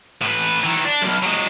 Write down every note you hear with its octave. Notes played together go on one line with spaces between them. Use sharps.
A2 B4
D#3 E3
D4
B1 F#2
F#3 G#3